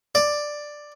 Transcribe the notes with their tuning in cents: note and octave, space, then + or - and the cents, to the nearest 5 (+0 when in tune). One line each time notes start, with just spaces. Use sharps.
D5 +10